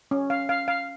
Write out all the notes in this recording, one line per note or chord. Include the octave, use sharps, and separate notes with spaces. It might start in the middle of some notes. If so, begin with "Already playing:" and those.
C#4
F5
F5
F5